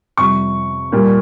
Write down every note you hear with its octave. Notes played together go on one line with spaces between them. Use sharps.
F2 C3 G3 C#6
A#2 G3